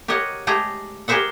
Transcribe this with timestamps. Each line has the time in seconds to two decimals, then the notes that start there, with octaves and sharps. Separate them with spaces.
0.08 G4 A#4 C#5 D#5 F#5
0.47 G#3 A3 G4 G#4 A#5
1.08 G4 G#4 A#4 C5 E5 F#5